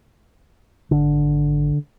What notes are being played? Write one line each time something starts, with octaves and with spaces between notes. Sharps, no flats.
G#1 D3